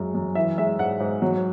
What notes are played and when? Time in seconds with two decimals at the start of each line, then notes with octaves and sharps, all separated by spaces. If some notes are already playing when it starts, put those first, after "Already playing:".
Already playing: F#2 G#3
0.15 F#2
0.35 E3 E5
0.58 G#3 E5
0.79 G#2 F#5
1.00 G#2
1.22 F#3